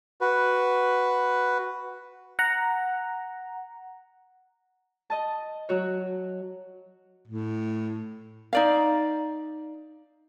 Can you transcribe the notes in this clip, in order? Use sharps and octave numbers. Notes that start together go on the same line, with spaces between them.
F#4 B4
F#5 A#5
D#5 A5
F#3 F#4 C#5
A2
D#4 D5 F5